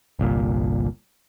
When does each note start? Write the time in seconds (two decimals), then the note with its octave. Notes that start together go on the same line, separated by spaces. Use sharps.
0.19 G1 C2 A#2